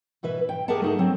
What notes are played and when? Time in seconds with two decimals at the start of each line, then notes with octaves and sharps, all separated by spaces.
0.23 B2 E3 B4 E5
0.49 G5
0.68 G4 G#4 A#4 E5 F#5 A5
0.82 A3 D#4 G#4
0.98 F#3 C4